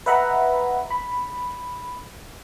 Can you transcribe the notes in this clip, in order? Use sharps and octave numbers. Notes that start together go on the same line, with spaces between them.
B4 D#5 E5 F#5 A#5 B5
B5